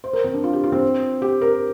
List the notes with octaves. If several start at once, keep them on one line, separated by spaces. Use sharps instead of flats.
C5
A#4
C4
D4
F4
G4
F4
C4
G4
A#4